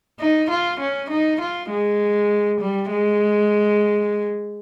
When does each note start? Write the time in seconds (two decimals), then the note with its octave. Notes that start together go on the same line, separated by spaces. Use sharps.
0.20 D#4
0.50 F4
0.80 C#4
1.10 D#4
1.41 F4
1.70 G#3
2.60 G3
2.91 G#3